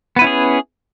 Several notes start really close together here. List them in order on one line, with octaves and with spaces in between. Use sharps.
B3 B4 E4 C#4 G#4